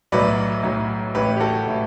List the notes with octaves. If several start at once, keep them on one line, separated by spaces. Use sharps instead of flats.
B1 A2 F#3 B4 D5
B1 A2 F#3
A1 A2 E3 G4 B4
G4
F#4 A4
A2 E3